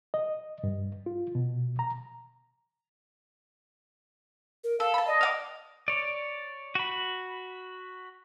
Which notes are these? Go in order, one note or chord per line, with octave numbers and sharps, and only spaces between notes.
D#5
G2
F4
B2
A#5
A#4
A4 F5
A5 B5
D5 D#5
F5 F#5 D6
C#5 D5
F#4 B5